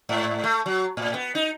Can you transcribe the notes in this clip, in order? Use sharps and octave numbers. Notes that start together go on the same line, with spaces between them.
G#2
A3
F#3
A2
B3
D#4